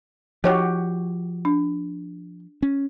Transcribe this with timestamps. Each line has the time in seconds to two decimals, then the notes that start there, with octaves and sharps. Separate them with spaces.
0.44 F3 D#4 F#4 G4 C#5
1.45 D4
2.62 C#4